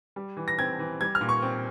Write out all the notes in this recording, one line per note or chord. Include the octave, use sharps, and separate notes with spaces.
G3
E3
A#6
C4 G#6
E3
G3 G#6
F6
A#2
C#6
C4